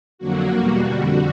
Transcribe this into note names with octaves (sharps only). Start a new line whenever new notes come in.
F2 D3 F#3 A#3 F#4
E2 B2 G3 A#3 F#4
F2 D3 G3